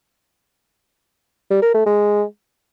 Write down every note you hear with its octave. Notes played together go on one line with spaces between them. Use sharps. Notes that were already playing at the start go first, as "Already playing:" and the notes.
G3
A#4
A3
G#3